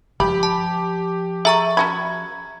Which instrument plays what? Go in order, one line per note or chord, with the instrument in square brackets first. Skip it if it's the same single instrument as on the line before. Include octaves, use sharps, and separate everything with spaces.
[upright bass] F3 [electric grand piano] G4 [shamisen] B5
[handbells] A5
[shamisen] G#4 A4 [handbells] E5 A#5 C#6
[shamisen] C#4 F#4 B5 [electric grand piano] G#6